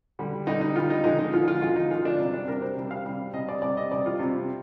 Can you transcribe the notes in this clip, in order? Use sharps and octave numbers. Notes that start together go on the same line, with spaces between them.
D3 G3
D3 G3 D#4
D#4
D3 G3 F4
D#4
D3 F3 G#3 D#4
D#4
D3 F3 G#3 F4
F4
D3 F3 G#3 F4
D#4
D3 F3 G#3 F4
D4
C3 G3
D4
C3 G3 A#4
C5
C3 G3
F5
C3 G3
C3 G3 D#5
D5
C3 G3 D5
D#5
C3 G3 D5
F4
C3 G3